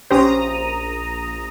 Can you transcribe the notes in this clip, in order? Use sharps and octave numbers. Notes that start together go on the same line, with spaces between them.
A#1 C#4 G4 C5 A#5 D#6